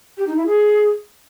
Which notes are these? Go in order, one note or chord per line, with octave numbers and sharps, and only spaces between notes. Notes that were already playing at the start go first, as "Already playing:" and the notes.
G4
D#4
E4
G#4